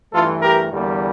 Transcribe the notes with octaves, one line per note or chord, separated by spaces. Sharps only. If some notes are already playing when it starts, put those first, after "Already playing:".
G2 E3 A3 F4 A4
G4 A#4
E2 D3 G3 A#3